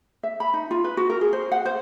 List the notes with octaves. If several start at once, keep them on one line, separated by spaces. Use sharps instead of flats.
E5
B5
D#4
F4
B4
F#4
A#4
G#4
C5
F#5
C5